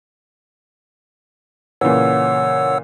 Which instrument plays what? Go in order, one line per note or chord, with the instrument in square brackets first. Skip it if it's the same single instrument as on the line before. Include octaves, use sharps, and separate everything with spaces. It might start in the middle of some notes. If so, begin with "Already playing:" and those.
[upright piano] A#2 C#3 E3 [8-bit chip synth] C#5 F#5 E6